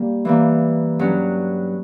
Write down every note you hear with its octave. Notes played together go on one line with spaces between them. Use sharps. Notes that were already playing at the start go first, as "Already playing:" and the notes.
Already playing: G3 A#3
E3 G3 A#3
G2 F#3 C#4